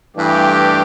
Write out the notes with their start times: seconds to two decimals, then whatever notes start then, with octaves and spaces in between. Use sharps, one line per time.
0.16 G2 E3 A3 G4